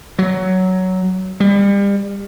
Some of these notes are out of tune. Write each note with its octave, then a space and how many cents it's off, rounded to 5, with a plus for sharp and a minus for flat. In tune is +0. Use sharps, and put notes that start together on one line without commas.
F#3 +10
G3 +35